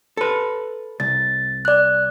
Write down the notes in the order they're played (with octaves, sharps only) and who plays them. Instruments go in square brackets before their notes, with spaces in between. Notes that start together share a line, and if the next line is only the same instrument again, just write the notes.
[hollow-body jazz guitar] A4 B4
[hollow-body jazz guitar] C2 [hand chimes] A6
[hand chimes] D5 F#6